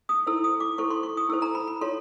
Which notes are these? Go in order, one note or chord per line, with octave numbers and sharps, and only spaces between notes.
D#6
E4 A4 C5 E6
D#6
D6
E4 A4 C5 C#6
C6
C#6
D#6
E4 A4 C5 E6
A#5
B5
B5
F4 A4 C#5 C6